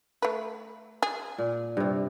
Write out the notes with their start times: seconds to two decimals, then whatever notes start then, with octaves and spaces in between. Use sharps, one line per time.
0.22 A3 B4
1.03 G#4
1.38 A#2
1.77 G2 C3